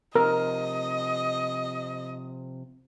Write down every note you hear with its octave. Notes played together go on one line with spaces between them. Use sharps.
C3 F3 A#4 D#5